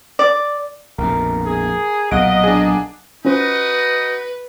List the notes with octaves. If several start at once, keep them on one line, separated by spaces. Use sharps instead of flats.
D5
A#1 F2 B2 A#4
G#4
B1 A#2 D#5 F5 F#5 D7
D4 G#4
C#4 D#4 F4 F#4 B4 C5 D#5